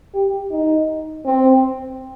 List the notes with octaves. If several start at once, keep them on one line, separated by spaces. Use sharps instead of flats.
G4
D#4
C4